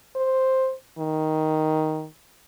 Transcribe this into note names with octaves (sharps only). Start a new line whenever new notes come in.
C5
D#3